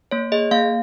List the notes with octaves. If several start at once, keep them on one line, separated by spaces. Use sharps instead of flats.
A#3 C#5
G#4 D#5
A#3 F5